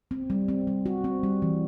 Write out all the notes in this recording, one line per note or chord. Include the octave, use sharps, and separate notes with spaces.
C4
G3
C4
G3
F#4
C4
G3
E3